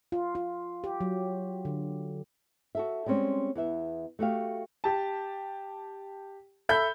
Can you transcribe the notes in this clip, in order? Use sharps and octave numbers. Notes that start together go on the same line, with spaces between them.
F4
F4
G4
F#3
D3
F#4 A4 E5
G3 G#3 C4 C#4
E2 B3 E5
A3 F#4 G4 F5
G4 A5
A4 E5 B5 G6